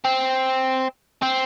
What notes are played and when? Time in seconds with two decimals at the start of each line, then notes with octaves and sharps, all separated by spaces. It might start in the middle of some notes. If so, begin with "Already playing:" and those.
0.05 C4
1.22 C4